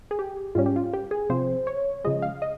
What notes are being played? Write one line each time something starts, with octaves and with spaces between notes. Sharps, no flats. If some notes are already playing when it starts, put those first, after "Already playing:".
G#4
G4
G#2 G3 C#4 F4
G4
F4
G4
G#4
C3 F3 C4 C5
C#5
C#3 F3 G#3 D#5
F5
D#5